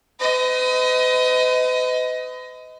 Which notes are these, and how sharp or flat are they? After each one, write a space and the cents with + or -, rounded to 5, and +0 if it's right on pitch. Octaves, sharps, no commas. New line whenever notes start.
B4 +45 D#5 +20